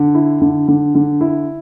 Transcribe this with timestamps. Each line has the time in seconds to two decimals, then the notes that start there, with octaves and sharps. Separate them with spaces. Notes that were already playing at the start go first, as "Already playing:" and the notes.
Already playing: D3
0.15 E4
0.41 D3
0.68 D3
0.95 D3
1.21 E4